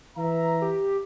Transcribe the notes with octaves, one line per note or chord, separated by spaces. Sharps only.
E3 E5 A#5
G4